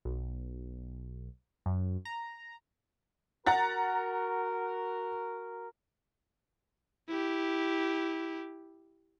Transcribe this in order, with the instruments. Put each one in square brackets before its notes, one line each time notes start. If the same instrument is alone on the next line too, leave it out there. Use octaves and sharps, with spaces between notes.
[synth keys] B1
F#2
A#5
[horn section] F#4 A#4 [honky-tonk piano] F#5 A#5 A6
[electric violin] E4 G4